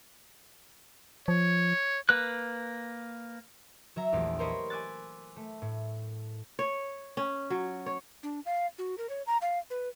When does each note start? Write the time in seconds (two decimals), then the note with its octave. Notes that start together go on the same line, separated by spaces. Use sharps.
1.28 F3 C#5
2.09 A#3 B4 F#6
3.96 F#3 E5 A#5
4.12 A#1 E2 A3 G4
4.39 A#4 C5 C#5 D#5 B5
4.70 G#5 D6 E6 F#6 A6
5.36 A3
5.62 A2
6.59 C#5
7.17 C#4
7.50 F#3
7.86 C#5
8.23 D4
8.46 F5
8.78 F#4
8.98 A#4
9.09 C#5
9.27 A#5
9.42 F5
9.70 B4